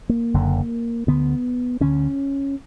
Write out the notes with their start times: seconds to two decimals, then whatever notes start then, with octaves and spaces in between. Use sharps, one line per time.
0.09 A#3
0.34 F#1 F#2 D3
1.07 D2 D3 B3
1.80 D2 D3 C#4